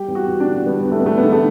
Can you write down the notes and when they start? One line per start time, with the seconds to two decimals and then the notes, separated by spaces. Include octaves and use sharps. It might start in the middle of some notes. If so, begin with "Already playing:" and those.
Already playing: G3 G4
0.08 E2
0.15 F#4
0.28 E2
0.40 D4
0.47 D3
0.66 G3 B3
0.85 E2
0.92 A3
0.99 B3
1.05 E2 A3
1.18 B3
1.23 D3
1.33 A3